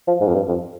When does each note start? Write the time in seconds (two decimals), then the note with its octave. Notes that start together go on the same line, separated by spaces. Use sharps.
0.08 F3
0.21 G#2
0.28 F2
0.35 G2
0.48 F2